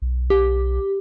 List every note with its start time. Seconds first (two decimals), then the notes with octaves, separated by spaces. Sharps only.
0.02 B1
0.30 G4